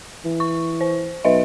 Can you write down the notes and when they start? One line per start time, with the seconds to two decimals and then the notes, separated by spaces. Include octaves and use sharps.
0.25 E3
0.40 C#6
0.81 C5
1.24 B1 B4 D#5 E5